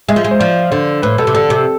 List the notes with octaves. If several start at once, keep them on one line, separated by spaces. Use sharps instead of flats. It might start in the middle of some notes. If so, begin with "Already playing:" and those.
G#3 E5
F3
G#3
C5
F3 D5
D3 C5
A2 B4
B2 A4
C3
D3 A4
C3